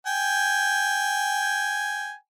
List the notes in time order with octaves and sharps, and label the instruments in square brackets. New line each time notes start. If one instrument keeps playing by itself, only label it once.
[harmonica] G5 G#5